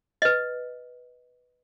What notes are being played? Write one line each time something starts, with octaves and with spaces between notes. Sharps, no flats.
B4 D#5